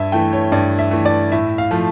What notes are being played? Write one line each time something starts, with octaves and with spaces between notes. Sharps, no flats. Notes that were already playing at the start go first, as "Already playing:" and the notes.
Already playing: G2 E5
E3 A3 G5
C#5
G2 D5
E5
E3 A3
D5
A2 E5
F5
F3 A3